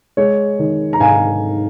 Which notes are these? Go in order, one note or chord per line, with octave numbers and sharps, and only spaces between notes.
G#3 C#5
D#3
A#5
G#2 F5 G#5